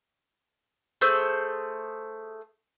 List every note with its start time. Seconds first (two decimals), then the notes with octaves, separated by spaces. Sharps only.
1.01 A3 G#4 C5 E6